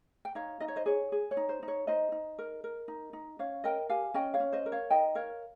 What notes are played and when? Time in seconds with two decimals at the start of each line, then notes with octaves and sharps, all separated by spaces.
0.25 G5
0.35 D#4 C#5 F5
0.60 D#4 D#5
0.68 C#5
0.76 C5 D#5
0.86 G#4 C#5
1.12 G#4
1.31 C#5
1.37 D#4
1.49 C5
1.63 D#4
1.68 C#5
1.87 D#4 C5 D#5
2.12 D#4
2.39 A#4
2.64 A#4
2.88 D#4
3.13 D#4
3.39 C#4 C#5 F5
3.64 A#4 D#5 G5
3.89 G4 F5 G#5
4.14 C#4 D#5 G5
4.34 C#5 F5
4.40 C#4
4.52 C5 D#5
4.66 A#4
4.72 C#5 F5
4.90 D#4 D#5 G5
5.15 A#4 C#5 F5